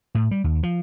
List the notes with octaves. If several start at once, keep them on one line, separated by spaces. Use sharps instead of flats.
A2
G3
D#2
F3